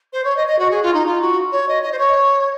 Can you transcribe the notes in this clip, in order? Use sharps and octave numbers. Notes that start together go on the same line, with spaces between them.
C5
C#5
D#5
D#5
F#4
G#4
F4
D#4
F4
F#4
C#5
D#5
D#5
C5
C#5